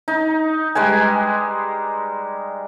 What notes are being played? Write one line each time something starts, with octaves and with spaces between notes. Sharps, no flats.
D#4
G3 G#3 B4 G#5